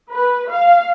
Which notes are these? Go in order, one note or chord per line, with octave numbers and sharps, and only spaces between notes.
B4
F5